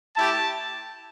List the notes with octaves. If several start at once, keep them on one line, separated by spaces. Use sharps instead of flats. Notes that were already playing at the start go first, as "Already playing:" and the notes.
A3 E4 G4 A5